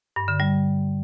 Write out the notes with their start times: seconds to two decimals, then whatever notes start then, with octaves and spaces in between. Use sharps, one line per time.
0.16 G2
0.28 D3
0.40 G3